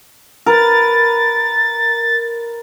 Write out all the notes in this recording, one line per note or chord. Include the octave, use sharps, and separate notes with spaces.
A#4 B4 A6